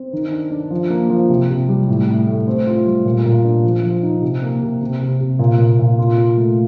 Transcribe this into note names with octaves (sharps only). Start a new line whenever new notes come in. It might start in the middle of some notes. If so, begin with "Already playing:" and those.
Already playing: C4
D#3
D4
D4
F3
A#3
F3
C3
C3
G3
A2
A2
A3
C4
F4
G3
A#2
A#2
D4
F3
F3
D#4
C3
A#3
C3
C3
C3
C3
A#2
A#2
A#2
F4
F4
A3